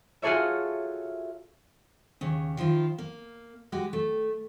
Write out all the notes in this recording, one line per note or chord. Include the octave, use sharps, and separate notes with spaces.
F4 F#4 G#4 A4 C#5 E5
D#2 C#3
D#3 F3 E4 F4
A#3
G#3 F#4 G4
A3